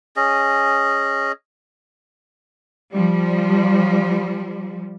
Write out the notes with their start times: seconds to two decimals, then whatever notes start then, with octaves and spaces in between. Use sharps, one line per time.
0.16 C#4 G#4 D#5
2.92 F3 G3